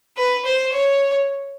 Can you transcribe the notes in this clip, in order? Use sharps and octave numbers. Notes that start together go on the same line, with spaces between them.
B4
C5
C#5